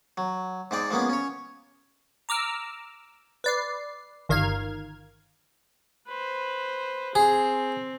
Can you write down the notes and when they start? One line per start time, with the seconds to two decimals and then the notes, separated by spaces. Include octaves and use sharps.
0.17 F#3
0.71 G#2 G#3 C4 D5
0.90 F3 G#3 A#3 B3 C#4
1.09 C#4 C#5
2.29 A#5 D6 E6 F6
3.44 B4 D5 C7
4.29 G1 D#3 A#4 F5 F6 G#6
6.08 B4 C5
7.15 C4 G#4